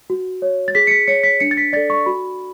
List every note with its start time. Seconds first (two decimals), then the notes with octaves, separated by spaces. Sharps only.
0.10 F#4
0.42 C#5
0.68 A6
0.75 G#4 B6
0.87 C#7
0.91 B6
1.08 C#5 C#7
1.23 B6
1.40 D4 C#7
1.51 A6
1.57 B6
1.73 D5 A6
1.76 A4
1.90 C#6
2.06 F#4 B5